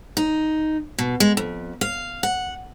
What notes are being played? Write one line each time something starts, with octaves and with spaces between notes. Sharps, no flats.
D#4
B2
G#3
F2
F5
F#5